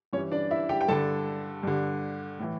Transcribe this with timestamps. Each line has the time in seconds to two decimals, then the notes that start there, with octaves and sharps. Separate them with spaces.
0.13 G2 C#4 C#5
0.18 E3
0.32 D4 D5
0.51 E4 E5
0.69 G4 G5
0.81 G5
0.88 G2 D3 A4 A5
1.63 G2 D3
2.39 A2 E3